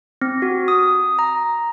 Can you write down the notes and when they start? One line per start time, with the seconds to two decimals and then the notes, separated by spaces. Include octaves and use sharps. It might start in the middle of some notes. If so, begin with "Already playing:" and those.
0.22 C4
0.42 F#4
0.68 D#6
1.19 A#5